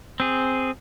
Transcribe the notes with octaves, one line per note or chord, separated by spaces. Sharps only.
C4 G#4